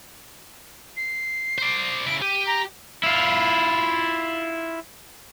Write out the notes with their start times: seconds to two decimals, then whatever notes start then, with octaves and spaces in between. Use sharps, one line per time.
0.97 C7
1.58 C5 D5
2.06 C#3 E4 D7
2.22 G4 D#7
2.47 A#5
3.03 E4 F4